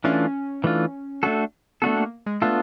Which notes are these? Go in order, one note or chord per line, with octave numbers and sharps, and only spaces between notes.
E3 A3 C#4 D4 F4
E3 A3 D4 F4
A3 D4 F#4 A4
A3 B3 D4 F#4 A4
A#3
G#3
A3 B3 D4 F4 A4